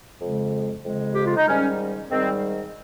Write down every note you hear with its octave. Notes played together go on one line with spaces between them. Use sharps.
F2 C#3 G#3
F2 C#3 G#3
G4
F4
D#4
G#2 D#3 G3 C#4
G#2 D#3 G3 C4